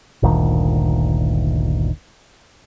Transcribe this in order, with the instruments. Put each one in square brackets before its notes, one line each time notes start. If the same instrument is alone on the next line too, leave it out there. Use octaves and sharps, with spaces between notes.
[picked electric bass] G1 D2 A#2 D#3